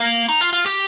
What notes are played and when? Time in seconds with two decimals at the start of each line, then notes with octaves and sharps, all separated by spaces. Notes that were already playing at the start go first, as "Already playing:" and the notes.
Already playing: A#3
0.29 D#4
0.41 F4
0.53 F4
0.66 G4